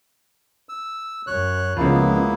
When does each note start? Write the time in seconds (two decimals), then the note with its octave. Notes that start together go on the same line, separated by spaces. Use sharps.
0.69 E6
1.27 F#2 C#5 F#6
1.77 C#2 C#3 F3 A#3 B3 E4